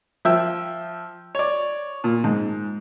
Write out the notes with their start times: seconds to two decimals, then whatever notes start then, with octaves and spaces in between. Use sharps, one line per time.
0.25 F3 E5 G5 E6
1.35 C#5 D5
2.04 A#2
2.24 G#2